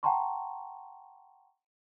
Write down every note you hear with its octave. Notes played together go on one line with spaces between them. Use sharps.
F#5 G5 A5 A#5 C6 C#6